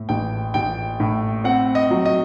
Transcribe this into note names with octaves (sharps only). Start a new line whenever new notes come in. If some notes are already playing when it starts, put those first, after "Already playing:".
Already playing: A2
A1 G5
A1 G5
A2
C4 F#5
D#5
F#3
D#5